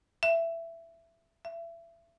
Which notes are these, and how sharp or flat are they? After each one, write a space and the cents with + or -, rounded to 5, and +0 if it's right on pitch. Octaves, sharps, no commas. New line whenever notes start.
E5 +15
E5 +30